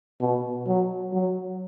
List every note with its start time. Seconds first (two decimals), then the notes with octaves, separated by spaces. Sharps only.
0.21 B2
0.67 F#3
1.13 F#3